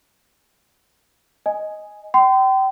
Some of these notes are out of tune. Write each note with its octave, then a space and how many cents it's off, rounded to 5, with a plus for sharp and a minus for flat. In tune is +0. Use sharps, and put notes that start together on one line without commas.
D#5 +0 G#5 +0
G5 -30 C6 -35